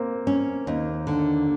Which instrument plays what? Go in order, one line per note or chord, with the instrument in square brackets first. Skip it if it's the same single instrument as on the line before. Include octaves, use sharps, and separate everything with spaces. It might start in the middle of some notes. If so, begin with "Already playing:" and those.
Already playing: [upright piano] A#3 C4
[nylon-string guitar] C#4
D#2
D3